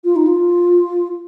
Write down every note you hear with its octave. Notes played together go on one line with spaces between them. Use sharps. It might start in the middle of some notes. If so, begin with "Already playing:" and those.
F4
D#4
F4